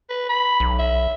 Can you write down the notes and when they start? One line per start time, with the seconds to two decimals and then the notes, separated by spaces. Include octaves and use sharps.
0.09 B4
0.29 B5
0.60 B1
0.79 E5